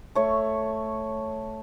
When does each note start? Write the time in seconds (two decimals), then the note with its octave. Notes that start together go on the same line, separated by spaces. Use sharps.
0.15 A3 C#5